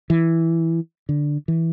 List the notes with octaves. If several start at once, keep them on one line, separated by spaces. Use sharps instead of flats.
E3
D3
E3